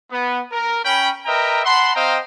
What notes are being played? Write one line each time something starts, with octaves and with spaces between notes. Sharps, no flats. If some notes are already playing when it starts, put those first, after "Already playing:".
B3
A#4
C#4 G5 B5
A#4 B4 D#5 E5 G5 A#5
F#5 A5 B5 C6
C4 C5 D#5 F5 G5 A#5